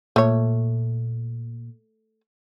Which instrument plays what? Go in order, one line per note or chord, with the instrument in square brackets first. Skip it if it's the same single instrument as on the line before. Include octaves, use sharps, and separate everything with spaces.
[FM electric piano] A#2 [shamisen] A3 C#5